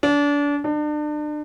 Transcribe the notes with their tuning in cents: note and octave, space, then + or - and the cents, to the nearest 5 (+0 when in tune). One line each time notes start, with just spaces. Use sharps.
D4 -30
D4 +35